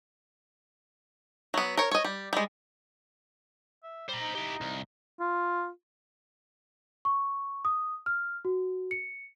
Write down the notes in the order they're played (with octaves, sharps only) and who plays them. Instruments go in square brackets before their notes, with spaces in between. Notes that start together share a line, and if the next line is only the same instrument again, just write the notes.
[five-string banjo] F#3 B3
A#4 C#5
C#5 D#5
G3
G3 G#3
[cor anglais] E5
[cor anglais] G3 [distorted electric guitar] C5 A#5
[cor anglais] D#4
[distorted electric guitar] E4 G4
C2
[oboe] F4
[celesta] C#6
D#6
F6
F#4
C#7